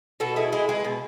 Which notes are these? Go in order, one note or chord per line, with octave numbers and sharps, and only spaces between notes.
B2 F#4 A4
G#3 E4 G#4
G#3 E4 G#4
G#3 G#4 B4
B2